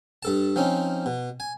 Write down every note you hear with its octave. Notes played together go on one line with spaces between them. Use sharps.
G2 A4 A5
F3 C4 C#4 D#4
B2
G#5